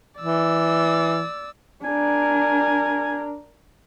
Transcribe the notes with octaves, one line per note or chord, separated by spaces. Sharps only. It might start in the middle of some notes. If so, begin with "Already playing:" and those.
E3 D5 E6
D4 A#4 G#5